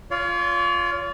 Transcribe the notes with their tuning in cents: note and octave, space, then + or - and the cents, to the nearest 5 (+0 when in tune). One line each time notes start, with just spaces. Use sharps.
F4 +0 C#5 +45 C6 +0